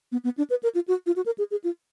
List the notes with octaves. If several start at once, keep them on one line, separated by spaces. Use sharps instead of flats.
B3
B3
D4
B4
A#4
F4
F#4
F4
F#4
A#4
G#4
G#4
F4